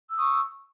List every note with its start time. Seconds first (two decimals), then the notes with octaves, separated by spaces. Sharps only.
0.11 E6
0.15 D#6
0.20 C#6